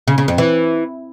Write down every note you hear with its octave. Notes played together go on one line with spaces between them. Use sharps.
C#3
C#3
F2
E3